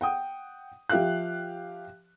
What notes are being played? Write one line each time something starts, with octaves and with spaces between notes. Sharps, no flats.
F#5 G5 D#6
F3 G4 E5 F5 F#6